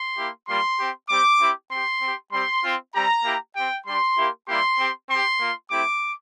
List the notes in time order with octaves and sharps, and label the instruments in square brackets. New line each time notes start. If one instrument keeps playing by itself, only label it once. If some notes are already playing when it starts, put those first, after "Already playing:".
Already playing: [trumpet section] C6
A#3 E4 G4
G3 A#3 F4 C6
C4 G4
G3 C4 G4 D6
C4 E4 G4
C4 G4 C6
C4 G4
G3 C4 G4 C6
C4 F4
G3 C4 G4 A#5
A#3 E4 G4
C4 G4 G5
G3 D4 G4 C6
A#3 E4 G4
G3 A#3 E4 G4 C6
C4 G4
C4 G4 C6
A#3 F4
A3 C4 E4 G4 D6